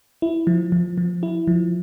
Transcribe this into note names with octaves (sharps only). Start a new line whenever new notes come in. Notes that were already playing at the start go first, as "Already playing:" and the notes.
E4
F3
F3
F3
E4
F3